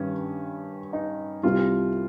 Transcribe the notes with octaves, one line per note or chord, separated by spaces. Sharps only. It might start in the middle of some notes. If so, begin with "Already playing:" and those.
Already playing: G2 D#3 G3 C#4
D#4
C2 C3 G3 F4